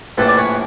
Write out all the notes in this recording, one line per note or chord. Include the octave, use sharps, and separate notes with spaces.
A#1 A2 E3 A4 B4
D5
B4 C#5